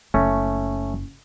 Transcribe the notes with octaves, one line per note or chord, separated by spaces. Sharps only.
F#1 A3 C#4